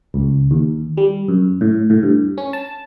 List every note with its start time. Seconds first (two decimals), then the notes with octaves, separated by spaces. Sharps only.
0.14 C#2
0.51 D#2
0.97 G3
1.28 F#2
1.61 A2
1.90 A2
2.03 G2
2.38 C#4
2.53 A5